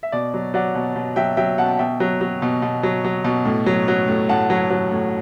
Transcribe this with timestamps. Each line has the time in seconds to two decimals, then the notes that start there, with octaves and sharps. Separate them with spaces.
0.03 E5
0.12 B2 D5
0.34 F#3
0.54 F#3 D5 F#5
0.75 B2
0.96 B2
1.16 F#3 E5 G5
1.37 F#3 E5 G5
1.58 B2 F#5 A5
1.79 B2 E5 G5
2.00 F#3
2.21 F#3
2.42 B2
2.62 B2
2.83 F#3
3.05 F#3
3.24 B2
3.45 A2
3.66 F#3
3.88 F#3
4.08 A2
4.29 A2 F#5 A5
4.50 F#3
4.70 F#3
4.92 A2